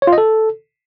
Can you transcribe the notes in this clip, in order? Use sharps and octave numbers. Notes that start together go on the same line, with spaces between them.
C#5
F4
D#5
A4